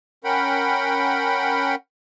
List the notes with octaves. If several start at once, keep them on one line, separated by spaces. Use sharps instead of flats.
C#4 A#4 F#5 G5 B5